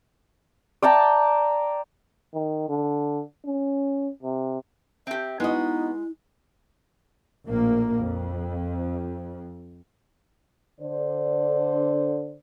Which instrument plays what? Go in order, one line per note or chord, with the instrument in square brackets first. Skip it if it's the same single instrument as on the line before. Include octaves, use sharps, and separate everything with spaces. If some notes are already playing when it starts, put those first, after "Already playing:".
[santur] D5 G5 A5 A#5
[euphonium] D#3
D3
C#4
C3
[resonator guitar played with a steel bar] C4 G4 [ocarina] E5
[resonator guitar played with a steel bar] G#3 D#5 [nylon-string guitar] B3 F#4 [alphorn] D#4 [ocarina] E4
[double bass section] A#1 A2 A#3
F2
[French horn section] D3 C5 D5